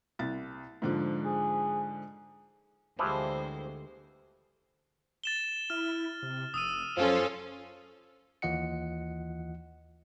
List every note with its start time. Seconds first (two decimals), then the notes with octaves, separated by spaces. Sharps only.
0.19 C2 A6
0.82 G#2 D3 F3
1.25 G#4
2.99 D2 E3 F3 G3 G#3 E4 C5
5.24 A6 E7 G7
5.70 E4 F6
6.22 C3
6.54 F1 D#6 E6 D#7
6.97 F#2 F3 C#4 F4 A4
8.42 D#2 E3 F4 D#5 F#5 C#7